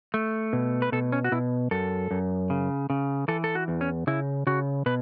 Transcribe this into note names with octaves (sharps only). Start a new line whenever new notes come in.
A3
B2
B4
B2 A4
C#4
F#4
B2 E4
F#2 A4
F#2
C#3
C#3
E3 A4
A4
F#4
E2
C#4
C#3 E4
C#3 F#4
B2 B4